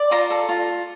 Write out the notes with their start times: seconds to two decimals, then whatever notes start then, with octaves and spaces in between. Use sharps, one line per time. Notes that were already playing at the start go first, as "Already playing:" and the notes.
Already playing: D5
0.11 F4 A#5
0.30 A4
0.49 F4